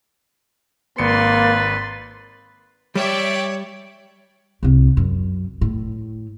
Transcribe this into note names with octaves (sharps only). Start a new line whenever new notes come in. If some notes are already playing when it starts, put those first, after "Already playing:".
G#1 A#3 B4 C6 A6 C#7
G3 C#5 D5 E5 G5
C2 C3
F#2
A2